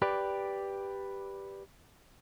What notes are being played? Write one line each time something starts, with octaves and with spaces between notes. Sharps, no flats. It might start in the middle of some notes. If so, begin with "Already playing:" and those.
G4 B4 D5